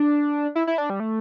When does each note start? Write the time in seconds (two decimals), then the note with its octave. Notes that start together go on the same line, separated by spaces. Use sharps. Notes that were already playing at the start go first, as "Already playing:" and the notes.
Already playing: D4
0.55 E4
0.67 E4
0.78 D4
0.90 G3
1.00 A3